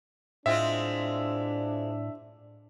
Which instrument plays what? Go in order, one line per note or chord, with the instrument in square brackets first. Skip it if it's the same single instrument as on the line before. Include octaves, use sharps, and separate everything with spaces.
[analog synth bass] A2 [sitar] G#3 C4 F4 [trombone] D4 [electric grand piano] E5